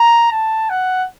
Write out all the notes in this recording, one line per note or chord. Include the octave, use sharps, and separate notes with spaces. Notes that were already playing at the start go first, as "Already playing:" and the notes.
Already playing: A#5
A5
F#5